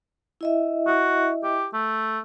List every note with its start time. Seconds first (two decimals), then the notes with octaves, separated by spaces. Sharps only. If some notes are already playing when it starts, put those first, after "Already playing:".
0.41 E4 D#5 E5
0.87 F#4
1.43 G4
1.73 A3